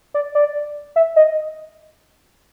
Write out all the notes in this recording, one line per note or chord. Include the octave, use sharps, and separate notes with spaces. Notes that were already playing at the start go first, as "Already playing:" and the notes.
D5
D5
E5
D#5